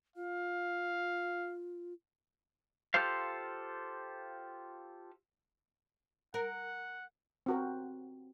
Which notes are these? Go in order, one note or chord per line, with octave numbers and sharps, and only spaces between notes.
F4 F5
F4 G4 A4 C5 F5
A#4 F#5
C4 F#4 A#4